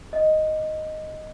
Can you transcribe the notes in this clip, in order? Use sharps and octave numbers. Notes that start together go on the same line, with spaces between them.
D#5